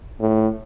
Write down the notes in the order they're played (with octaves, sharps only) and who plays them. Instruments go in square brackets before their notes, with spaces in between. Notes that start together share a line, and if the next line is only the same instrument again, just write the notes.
[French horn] A2